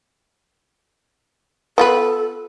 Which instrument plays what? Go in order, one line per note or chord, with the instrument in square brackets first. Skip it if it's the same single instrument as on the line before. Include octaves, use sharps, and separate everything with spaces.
[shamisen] B3 F4 B4 [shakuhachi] A4